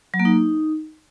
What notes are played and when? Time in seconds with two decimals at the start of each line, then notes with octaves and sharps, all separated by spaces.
0.14 F#3
0.19 A#3
0.25 D#4